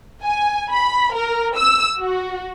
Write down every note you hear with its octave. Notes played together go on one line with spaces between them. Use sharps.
G#5
B5
A#4
E6
F#4